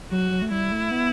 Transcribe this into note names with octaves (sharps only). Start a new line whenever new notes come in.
F#3 F#4
F#3
A3
G3 E4
A3
B3